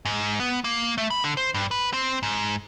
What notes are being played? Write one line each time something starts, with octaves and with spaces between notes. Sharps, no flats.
G#2
B3
A#3
A3
B5
D3
C5
G2
B4
C4
G#2